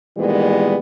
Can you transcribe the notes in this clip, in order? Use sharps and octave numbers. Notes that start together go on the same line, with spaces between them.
A#2 D#3 E3 G3 G#3 B3